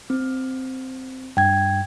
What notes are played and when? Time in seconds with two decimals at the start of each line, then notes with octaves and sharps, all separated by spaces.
0.10 C4
1.37 G2 G5 G#6